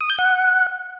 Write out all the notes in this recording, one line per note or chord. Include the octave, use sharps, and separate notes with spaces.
D#6
G6
F#5